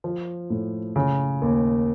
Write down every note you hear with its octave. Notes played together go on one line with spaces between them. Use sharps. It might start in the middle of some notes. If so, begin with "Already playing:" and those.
F3
A2
C#3
D#2